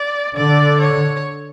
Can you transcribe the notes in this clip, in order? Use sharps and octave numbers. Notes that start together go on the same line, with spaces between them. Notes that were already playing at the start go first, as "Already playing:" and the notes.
Already playing: D5
D3 D5
C#5